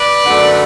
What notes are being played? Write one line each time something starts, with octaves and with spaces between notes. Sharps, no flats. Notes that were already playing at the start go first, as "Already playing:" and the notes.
Already playing: B4 D5
F#2 D3 A3